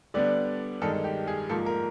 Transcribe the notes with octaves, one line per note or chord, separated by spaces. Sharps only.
D3 G3 B3 D4 D5
G2 D#3 G#3 A4
G4
G#4
G#2 F3 A#3 A4
A#4